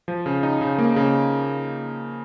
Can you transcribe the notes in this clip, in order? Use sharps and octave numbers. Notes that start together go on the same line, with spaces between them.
F3
C#3
D#4
C#3
A#3
C#3